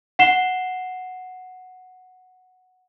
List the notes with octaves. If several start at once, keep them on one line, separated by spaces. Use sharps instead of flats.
F#5 C7 E7 G7